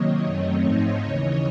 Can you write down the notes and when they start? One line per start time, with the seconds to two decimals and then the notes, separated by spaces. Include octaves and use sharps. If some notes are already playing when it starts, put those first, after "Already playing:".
Already playing: C3 D#3 F#3 A#3 C#5 D#5
0.24 F#2 D#3 F#3 A3 C4
0.63 G#2 F3 A3 C4 D#4
1.01 D#2 C#3 E3 C#5 D#5